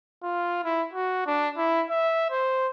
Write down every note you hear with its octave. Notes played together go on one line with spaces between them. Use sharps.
F4
E4
F#4
D4
E4
E5
C5